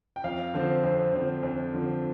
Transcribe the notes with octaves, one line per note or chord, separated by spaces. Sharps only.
G5
F2 F5
D3 F3 C4
F2
D3 F3 C4
F2
D3 F3 C4